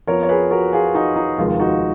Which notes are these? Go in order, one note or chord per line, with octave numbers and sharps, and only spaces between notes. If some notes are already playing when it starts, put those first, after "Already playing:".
F2 F3 B3 A#4 C#5
C#5
G#4 B4
F#4 A#4
F4 G#4
D#4 F#4
D#4
F1 D#2 D#3 G#3 F4
D#4 F#4